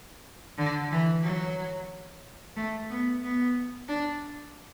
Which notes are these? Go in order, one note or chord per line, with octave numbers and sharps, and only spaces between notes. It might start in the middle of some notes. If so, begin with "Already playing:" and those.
D3
E3
F#3
A3
B3
B3
D4